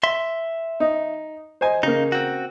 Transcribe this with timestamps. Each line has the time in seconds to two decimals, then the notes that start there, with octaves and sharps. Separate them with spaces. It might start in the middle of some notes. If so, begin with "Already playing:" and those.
0.03 E5 C6
0.80 D#4
1.61 C5 D#5 G#5
1.83 C#3 A#3 D#4
2.12 C4 F#4